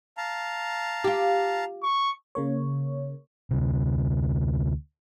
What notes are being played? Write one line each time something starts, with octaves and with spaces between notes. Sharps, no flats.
F5 A5 A#5
F4 G4
C#6
C#3 A#3 C#5
D2 C3